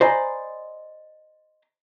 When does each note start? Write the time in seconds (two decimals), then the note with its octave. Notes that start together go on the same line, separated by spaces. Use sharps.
0.01 C5 D5 D#5 G#5 A#5 B5